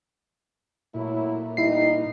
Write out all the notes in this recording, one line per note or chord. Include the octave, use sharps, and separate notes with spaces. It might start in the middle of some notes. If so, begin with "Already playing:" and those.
A#2 F#3 A3 E4
E2 G3 D#4 E4 C7